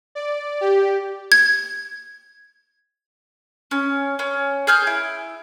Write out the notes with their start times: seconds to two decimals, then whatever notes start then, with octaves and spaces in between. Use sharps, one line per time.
0.15 D5
0.61 G4
1.32 G#6
3.71 C#4
4.19 C#4
4.67 G#4 F6 G6
4.87 E4